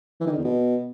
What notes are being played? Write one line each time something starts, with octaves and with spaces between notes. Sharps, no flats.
E3
D#3
D3
E2
B2